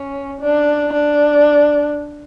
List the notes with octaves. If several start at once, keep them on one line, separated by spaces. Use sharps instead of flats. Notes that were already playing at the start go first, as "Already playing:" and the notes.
Already playing: C#4
D4
D4